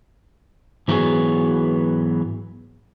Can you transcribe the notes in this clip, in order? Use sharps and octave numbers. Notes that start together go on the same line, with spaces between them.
G#2 E3 F#3 B3 F#4 G#4